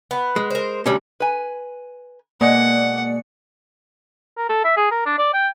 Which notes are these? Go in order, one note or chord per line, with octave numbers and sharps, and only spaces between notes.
B3
G#3
A#4 C5
D2 G3 C#4
B4 G#5
B2 G#3 A#3 D5 F#5 C#7
A#4
A4
E5
G#4
A#4
D4
D5
G5